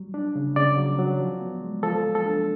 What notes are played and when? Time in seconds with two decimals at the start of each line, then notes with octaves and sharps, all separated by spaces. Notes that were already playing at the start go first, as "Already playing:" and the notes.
Already playing: F#3 G3
0.14 D4
0.36 C#3
0.56 C#3 D5
0.78 F#3
0.99 F#3
1.20 F3
1.41 B3
1.62 G#3
1.83 F3 A4
2.04 F3
2.15 A4
2.26 D4